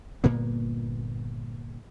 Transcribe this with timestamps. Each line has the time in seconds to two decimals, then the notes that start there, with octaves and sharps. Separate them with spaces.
0.24 G1 A#2 A#3 B3